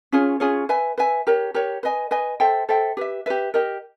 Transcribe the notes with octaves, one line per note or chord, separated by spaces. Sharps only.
C#4 F4 G#4 C#5
C#4 F4 G#4 C#5
B4 E5 G#5
B4 E5 G#5
G4 A#4 C#5
G4 A#4 C#5
B4 D#5 G#5
B4 D#5 G#5
A4 C5 E5 G5
A4 C5 E5 G5
G4 B4 E5
G4 B4 E5
G4 A#4 D#5